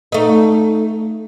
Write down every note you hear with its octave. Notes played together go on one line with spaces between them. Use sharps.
A3 D#4